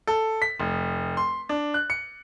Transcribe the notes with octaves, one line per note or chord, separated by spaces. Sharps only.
A4
B6
F1
C6
D4
F#6
C#7